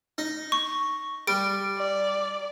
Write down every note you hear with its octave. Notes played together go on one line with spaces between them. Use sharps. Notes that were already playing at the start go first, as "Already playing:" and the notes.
D#4
C#6
G3 D7
D5